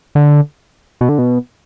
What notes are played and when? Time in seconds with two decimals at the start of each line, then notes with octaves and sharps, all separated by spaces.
0.15 D3
1.01 B2
1.09 D3
1.18 B2